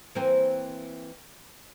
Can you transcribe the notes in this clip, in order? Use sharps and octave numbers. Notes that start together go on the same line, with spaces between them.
E3 A#3 C4